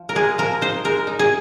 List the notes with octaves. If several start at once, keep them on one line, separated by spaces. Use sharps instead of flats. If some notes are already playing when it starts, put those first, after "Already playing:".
Already playing: F3
A#4
G#3 G#4
F3 A#4
D#4 C5
G#3 A#4
D#4
G#4